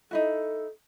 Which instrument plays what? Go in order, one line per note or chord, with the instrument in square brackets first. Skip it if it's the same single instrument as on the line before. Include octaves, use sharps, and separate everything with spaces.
[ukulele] D#4 E4 F#4 [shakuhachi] A4